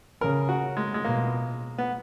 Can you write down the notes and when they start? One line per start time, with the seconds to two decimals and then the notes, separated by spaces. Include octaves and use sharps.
0.21 C#3 A#4
0.49 F#4
0.77 G#3
0.94 G#3
1.04 B2 A#3
1.78 B3